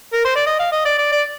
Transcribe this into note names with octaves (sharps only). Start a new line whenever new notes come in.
A#4
C5
D5
D#5
F5
D#5
D5
D5
D5